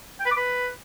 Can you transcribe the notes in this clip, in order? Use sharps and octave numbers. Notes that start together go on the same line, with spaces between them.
G5
B4
D6
B4